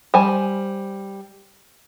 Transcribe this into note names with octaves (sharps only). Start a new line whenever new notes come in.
G3 C5 G#5